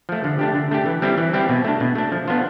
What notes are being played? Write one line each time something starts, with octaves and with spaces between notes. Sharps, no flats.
F3 A3
D3
A3 D4 G4
D3
A3 D4 G4
E3
G3 C4 E4 G4
E3
G3 C4 E4 G4
B2
A3 D4
B2
A3 D4
F3
B3 D4 F4 C5